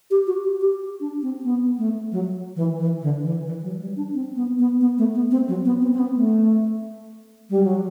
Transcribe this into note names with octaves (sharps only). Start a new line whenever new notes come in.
G4
F#4
G4
G4
D4
C4
B3
A3
F#3
E3
E3
D3
E3
E3
F#3
G3
D4
C4
B3
B3
B3
A3
B3
C4
F#3
B3
C4
C4
B3
A3
G3
F#3